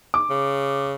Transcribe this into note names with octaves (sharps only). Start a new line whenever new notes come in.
D6
C#3